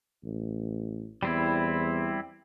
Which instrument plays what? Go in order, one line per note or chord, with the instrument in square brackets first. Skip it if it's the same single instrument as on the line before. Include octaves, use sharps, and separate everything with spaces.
[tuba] A1
[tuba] E2 [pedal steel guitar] G3 C4 E4